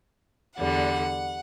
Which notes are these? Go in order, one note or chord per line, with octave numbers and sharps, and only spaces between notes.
E2 D3 G3 F#5